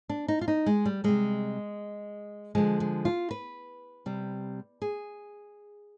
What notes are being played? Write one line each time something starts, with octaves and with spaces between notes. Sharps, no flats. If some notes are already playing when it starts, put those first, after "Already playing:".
D4
D#4
F4
D#4
G#3
G3
C3 G3 G#3
D3 F3 G#3
G#3
F4
B4
C3 G3
G#4